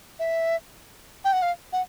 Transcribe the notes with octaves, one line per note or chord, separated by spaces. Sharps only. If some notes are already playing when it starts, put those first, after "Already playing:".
E5
G5
F#5
F5
F#5